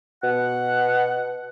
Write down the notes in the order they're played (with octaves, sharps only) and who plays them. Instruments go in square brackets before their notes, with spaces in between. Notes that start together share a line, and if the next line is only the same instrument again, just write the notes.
[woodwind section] B2 F#5